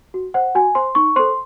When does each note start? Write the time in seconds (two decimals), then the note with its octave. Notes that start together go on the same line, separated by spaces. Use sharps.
0.14 F#4
0.34 C5 F#5
0.55 F#4 G#5
0.75 C5 C6
0.95 D#4 C#6
1.16 A4 C5 C6